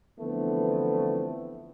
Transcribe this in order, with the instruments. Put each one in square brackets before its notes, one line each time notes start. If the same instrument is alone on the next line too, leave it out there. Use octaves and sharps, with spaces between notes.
[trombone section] D3 E3 F3 A3 B3 C4